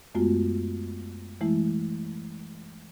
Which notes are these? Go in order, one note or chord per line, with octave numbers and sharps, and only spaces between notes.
F#2 G#3 A3 B3 F4 F#4
E3 G#3 A3 E4